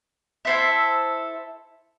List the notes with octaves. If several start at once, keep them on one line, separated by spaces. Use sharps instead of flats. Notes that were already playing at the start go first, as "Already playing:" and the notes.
E4 A4 C5 E5